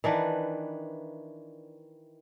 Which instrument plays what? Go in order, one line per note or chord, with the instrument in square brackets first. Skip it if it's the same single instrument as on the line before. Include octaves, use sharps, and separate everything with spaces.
[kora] D#3 E3 D4 B4